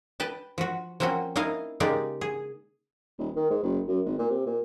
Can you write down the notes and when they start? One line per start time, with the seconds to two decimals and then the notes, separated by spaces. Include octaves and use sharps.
0.20 B4 G5 A5
0.58 F3 F#4
1.00 F3 A#3 C4 C#4 F#4
1.36 A#3 D#4 E4 D#5 F5
1.80 C#3 G#3 A#3 D#4 G4 D5
2.21 G#4
3.19 D#1
3.36 D#3
3.50 G#2
3.63 F#1
3.88 F#2
4.05 G#1
4.19 A#2
4.30 C3
4.46 A#2